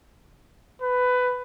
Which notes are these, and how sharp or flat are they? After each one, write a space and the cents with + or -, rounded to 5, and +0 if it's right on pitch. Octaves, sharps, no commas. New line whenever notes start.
B4 +15